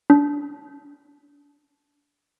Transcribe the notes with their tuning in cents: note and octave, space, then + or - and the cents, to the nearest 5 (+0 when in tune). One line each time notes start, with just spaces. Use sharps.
D4 -25